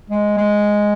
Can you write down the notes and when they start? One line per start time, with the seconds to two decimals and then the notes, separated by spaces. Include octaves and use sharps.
0.10 G#3
0.37 G#3